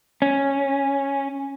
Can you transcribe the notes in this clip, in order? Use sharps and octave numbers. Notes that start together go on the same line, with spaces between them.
C#4